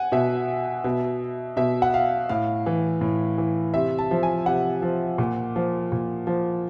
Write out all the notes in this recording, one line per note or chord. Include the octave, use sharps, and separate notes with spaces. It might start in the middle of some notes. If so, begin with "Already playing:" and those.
Already playing: F#5 G#5
B2 E5
B2
B2 E5
F#5
F5
A2 F5
E3
A2
E3
C3 E5
A5
F3
G#5
C3 F#5
F3
A#2
F3
A#2
F3